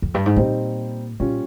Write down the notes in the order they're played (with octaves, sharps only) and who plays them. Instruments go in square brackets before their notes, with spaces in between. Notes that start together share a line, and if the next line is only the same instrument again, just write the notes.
[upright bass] F2
G2
G#2
[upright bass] A#2 [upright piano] G3 C4 D#4
[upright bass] A#2 [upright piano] G3 C#4 F4